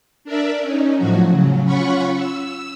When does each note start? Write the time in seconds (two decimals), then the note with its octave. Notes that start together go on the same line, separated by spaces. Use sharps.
0.24 D4 A#4 D5 E5
0.62 C#4 D#4
0.97 A2 F3 F#3 F#4
1.31 C#3 F#3
1.65 C#4 F4 F#5 B5 C#6
2.16 E6